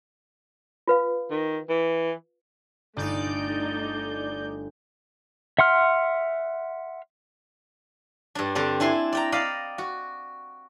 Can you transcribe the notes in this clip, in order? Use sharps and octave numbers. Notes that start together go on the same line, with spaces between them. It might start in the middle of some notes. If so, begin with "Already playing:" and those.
F4 B4 F5
D#3
E3
G1 A3 D#4 D5 G6
E5 F#5 C6 F6
G2 D4
D3 G3 C4 D4
D4 E4 G#5 C6
D5 G5 A#5
D5 D#5 F5 A#5 B5
F#4